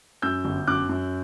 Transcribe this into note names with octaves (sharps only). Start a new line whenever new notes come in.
F#2 E6 G6
G1
F#2 D6 F#6
F#2